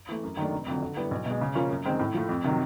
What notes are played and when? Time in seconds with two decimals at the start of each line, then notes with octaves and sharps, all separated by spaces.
0.09 E3 A3
0.23 F#2
0.37 D#3 F#3 A3 D4
0.52 F1
0.67 F2 D3 F#3
0.82 D3
0.97 G3 B3 E4
1.11 B1
1.26 B2
1.31 G#3
1.41 C#3
1.55 F3 A#3 C#4 F4
1.71 F#2
1.86 D#3 G#3 C4
1.99 A2
2.14 F3 A3
2.29 F2
2.44 C3 D#3 F#3